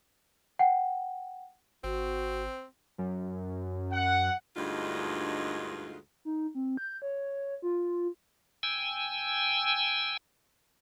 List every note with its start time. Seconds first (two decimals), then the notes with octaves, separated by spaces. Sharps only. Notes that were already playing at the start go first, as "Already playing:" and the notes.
0.59 F#5 G5
1.84 G#1 C4 F#4
2.98 F#2
3.93 F#5
4.57 D2 G2 G#3 D#4 F4
6.25 D#4
6.55 C4
6.77 G6
7.02 C#5
7.62 F4
8.63 G5 G#5 E6